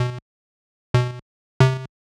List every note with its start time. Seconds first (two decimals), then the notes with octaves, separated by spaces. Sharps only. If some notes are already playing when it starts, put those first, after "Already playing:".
Already playing: B2
0.94 B2
1.60 C3